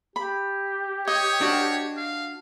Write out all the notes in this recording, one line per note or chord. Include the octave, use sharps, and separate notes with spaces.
G4 B5
C#5 D#5
D4 F#4
F5